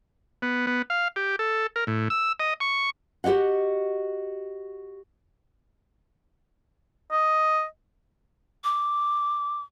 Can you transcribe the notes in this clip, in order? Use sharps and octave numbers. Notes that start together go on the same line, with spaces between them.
B3
B3
F5
G4
A4
A#4
A2
E6
D#5
C#6
F#4 G4 C#5 D#5 F#5
D#5
D6